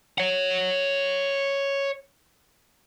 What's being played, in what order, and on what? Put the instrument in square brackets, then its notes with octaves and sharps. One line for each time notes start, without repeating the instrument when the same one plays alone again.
[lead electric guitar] C#5 F#5